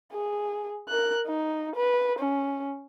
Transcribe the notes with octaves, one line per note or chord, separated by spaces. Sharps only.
G#4
A#4 F#6
D#4
B4
C#4